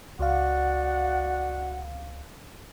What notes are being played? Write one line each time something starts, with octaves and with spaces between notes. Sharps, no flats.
C#2 F#4 D5 F5 F#5